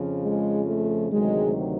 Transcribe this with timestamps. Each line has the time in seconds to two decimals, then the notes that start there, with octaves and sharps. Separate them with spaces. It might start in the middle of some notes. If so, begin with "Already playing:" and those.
Already playing: F2 C#3 F3
0.21 G#3
0.66 A3
1.11 D2 C3 D#3 F#3 G#3